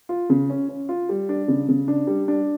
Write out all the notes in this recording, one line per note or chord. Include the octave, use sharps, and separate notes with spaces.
F4
C#3
C#4
C#4
F4
G3
D4
C#3
C#3
D4
G3
D4